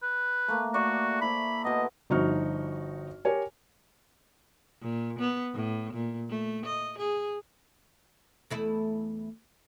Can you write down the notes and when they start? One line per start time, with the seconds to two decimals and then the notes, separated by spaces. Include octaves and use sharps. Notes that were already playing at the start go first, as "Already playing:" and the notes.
0.03 B4
0.48 A3 A#3
0.74 F#4 D5 E5 C#6
1.21 E4 C5 B5
1.64 B2 B3 D#5
2.10 G1 F3 D#4 F#4 C#6 F6
3.25 G4 A#4 C#5 G#5
4.82 A#2
5.19 B3
5.54 A2
5.94 A#2
6.29 A3
6.66 D#5
6.98 G#4
8.50 E2 A3 E4